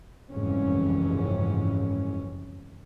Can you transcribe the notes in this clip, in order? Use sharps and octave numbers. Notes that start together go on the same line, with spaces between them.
F#1 C2 F2 G#2 E3 C#4